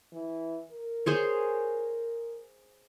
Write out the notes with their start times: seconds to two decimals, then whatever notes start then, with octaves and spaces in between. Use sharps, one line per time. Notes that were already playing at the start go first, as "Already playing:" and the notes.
0.13 E3
0.71 A#4
1.06 G#4 C5 C#5